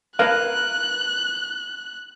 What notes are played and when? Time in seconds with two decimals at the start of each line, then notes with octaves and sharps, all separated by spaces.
0.19 A#4 B4 F5 F#6